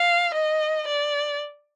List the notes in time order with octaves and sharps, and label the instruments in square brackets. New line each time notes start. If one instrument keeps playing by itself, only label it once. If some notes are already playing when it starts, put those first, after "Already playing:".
Already playing: [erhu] F5
D#5
D5